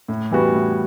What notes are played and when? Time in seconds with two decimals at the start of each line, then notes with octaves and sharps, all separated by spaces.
0.08 A2
0.31 E3 G3 B3 F#4
0.54 A2